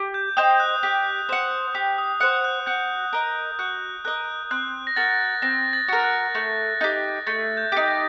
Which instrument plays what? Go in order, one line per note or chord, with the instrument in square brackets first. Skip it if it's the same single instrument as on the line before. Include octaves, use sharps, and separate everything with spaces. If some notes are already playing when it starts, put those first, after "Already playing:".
Already playing: [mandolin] G4
[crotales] G6
[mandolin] C5 D#5 G5 [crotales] D#6
[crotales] F#6
[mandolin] G4
C5 F#5
[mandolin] G4 [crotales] D#6
[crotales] D#6
[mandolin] C5 F#5 [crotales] F#6
[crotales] F#6
[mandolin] F#4 [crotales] G6
[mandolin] A#4 D#5
[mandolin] F#4 [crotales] F#6
[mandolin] A#4 D#5 [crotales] F#6
[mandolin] C4 [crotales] F#6
[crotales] A#6
[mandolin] F#4 A#4 [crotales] A6
[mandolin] C4 [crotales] A#6
[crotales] A6
[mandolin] F#4 A#4
[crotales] F#6
[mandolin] A3
D#4 G4
[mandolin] A3 [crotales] A6
[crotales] G6
[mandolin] D#4 G4
[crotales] A#6